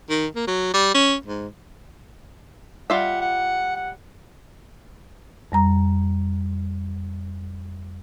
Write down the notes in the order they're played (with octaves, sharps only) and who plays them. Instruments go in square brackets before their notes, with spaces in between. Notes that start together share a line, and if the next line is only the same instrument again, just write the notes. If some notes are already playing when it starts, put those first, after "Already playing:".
[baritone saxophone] D#3
A#3
F#3
G3
C#4
G#2
[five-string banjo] G3 F4 E5 [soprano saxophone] F#5
[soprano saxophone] F#5
F#5
[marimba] F2 G3 A#5